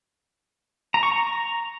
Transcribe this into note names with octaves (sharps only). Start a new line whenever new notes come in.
A#5
C#6
A#5